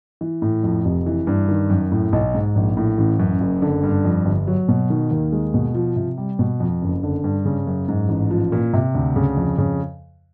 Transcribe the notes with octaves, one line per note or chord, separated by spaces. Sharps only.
E3
A2
F2
F1
E3
G2
D#3
F#2
A2
B1
G#2
A#1
A2
A1
F#2
F#1
D3
G2
F2
G1
F#3
B2
D#3
D#2
G#3
B2
F3
C3
G3
B2
F2
F#1
D3
G2
C#3
F#2
G#2
A1
F3
A#2
C3
D2
C#3
F2
C#3